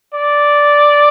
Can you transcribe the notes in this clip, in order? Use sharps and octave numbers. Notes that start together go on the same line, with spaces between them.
D5